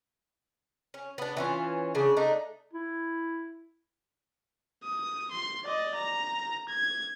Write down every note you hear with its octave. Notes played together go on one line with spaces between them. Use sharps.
C#4
B3 D4
E3 C#4 F4
C#3 D4
A3 D4 D#4
E4
D#6
C6
D5 D#5
A#5
G#6